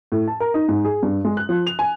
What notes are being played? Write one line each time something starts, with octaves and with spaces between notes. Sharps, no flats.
A2
A5
A#4
D#4
G#2
G#4
G2
G#3
F#6
F3
F7
G#5